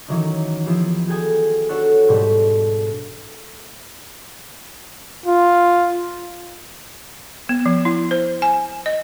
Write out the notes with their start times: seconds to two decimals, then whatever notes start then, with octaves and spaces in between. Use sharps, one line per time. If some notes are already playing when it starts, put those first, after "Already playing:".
0.08 D#3 E3 F#3 C#4 D#4
0.66 F3 B3 E4 G4 D6 C7
1.08 F#4 G#4 A4 G5 G#5 D#6
1.69 D4 F#4 A4 C#5 F#5
2.08 G#2 B2 G3 G4 A4 D5
5.26 F4
7.49 B3
7.66 F3
7.85 E4
8.11 C5
8.42 G#5
8.86 D#5